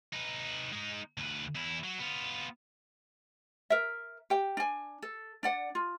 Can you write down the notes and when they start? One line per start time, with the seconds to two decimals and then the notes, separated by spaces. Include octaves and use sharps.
0.13 D#4 B4
0.72 G#3 D#4
1.18 D2 B4
1.55 E2 E4
1.84 F#3
1.99 B3 F4
3.70 A#4 E5
4.30 G4 G5
4.57 D4 G#5
5.02 A4
5.43 D4 D5 F#5
5.75 F4